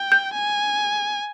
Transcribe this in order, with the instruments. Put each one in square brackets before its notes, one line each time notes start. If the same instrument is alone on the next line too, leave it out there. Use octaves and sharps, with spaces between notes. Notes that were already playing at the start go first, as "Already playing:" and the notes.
Already playing: [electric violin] G5
[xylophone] G6
[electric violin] G#5